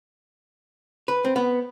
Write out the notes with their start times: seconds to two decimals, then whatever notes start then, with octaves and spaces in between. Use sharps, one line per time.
1.08 B4
1.25 C4
1.36 B3